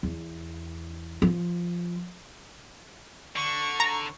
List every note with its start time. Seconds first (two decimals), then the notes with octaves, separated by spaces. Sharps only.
0.03 E2
1.22 F3
3.36 D3 C#6
3.80 A#5